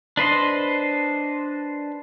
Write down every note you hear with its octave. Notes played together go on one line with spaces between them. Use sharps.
D4 B4 C5 D#5